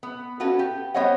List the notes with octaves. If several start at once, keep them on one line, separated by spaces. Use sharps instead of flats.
B3
C#4 F4 F#4 A4 B4
G4
G3 B3 C5 C#5 D#5 F#5